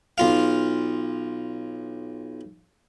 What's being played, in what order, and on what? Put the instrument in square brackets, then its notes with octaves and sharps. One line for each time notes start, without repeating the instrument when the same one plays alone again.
[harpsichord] B1 F4 F5